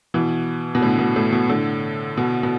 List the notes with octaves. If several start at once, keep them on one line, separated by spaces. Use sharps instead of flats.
B2 E3
B2
A2 D3
B2
A2
B2
A2 D3
B2
B2